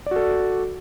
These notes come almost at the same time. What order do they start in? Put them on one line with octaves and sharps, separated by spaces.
D5 F#4 A4